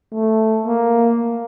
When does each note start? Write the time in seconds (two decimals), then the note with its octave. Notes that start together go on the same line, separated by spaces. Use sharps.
0.13 A3
0.66 A#3